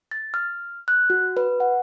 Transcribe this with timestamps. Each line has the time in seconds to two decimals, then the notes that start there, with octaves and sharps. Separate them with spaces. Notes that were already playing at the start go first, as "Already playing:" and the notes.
0.11 A6
0.34 F6
0.88 F#6
1.10 F#4
1.37 B4
1.60 F#5